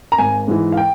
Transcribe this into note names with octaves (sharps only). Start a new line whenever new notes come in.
A#5
G#1 G#5
G#2 E3
F5
G5